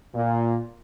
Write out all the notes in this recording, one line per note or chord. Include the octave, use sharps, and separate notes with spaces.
A#2